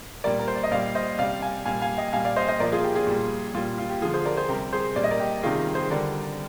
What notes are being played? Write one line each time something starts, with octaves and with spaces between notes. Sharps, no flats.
A#2 G3 A#4 D5
A#4
C5
D5
D#5
A#2 G3 D5 F5
C5 D#5
C3 G3 D5 F5
F5 G#5
A#2 G3 F5 G#5
F5 G#5
D#5 G5
A#2 G3 F5 G#5
D5 F5
C5 D#5
C5 D#5
A#2 F3 A#4 D5
F4 G#4
G4
F4 G#4
A#2 G3
A#2 G3 F4
F4
G4
D3 F3 F4 G#4
G#4 C5
A#4 D5
G#4 C5
C3 G3 G4 A#4
G#4 C5
A#2 G3 D5
D#5
A#4 D5
G4
C3 D#3 G3 F4 G#4
G#4 C5
D3 G3 A#4 D5